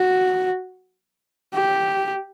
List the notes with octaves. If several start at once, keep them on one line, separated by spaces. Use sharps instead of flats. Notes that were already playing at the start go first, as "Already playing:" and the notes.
Already playing: F#4
G4